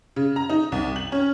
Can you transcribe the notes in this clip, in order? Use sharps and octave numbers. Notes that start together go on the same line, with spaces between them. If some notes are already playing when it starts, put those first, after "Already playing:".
C#3
A#5
D#4
C2
F#7
C#4